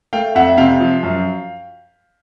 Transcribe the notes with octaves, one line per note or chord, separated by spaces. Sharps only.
A3 F5 G5
F2 E5 F#5
C3 F5 G5
F3
F#2